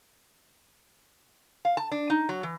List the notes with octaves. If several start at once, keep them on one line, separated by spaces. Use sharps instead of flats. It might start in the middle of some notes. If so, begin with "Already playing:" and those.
F5
A5
D4
D#4
F#3
E3